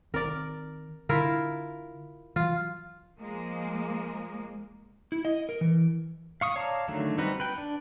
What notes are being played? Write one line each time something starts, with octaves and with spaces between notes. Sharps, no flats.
D#3 C4 A#4 D5
D3 E4 F4 A#4
E3 F#3 F4
F3 G#3 A#3
E4
D#5
A#4
E3
F5 C#6 D#6
C#5 D5 F5 A5 A#5
D3 D#3 F#3 A3
G3 C4 D#4 F#4 B4
B4 G5
D4